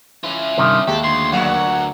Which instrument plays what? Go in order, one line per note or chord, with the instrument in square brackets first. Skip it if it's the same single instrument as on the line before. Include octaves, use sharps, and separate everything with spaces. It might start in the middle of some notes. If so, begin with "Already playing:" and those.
[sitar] E3 [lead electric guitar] C#4 F4
[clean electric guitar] G2 C3 D#3
[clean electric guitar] D#2 [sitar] G#3 [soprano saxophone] G4 [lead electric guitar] A4
[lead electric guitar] D2 [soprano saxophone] C6
[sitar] A#2 F#3 [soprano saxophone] F#5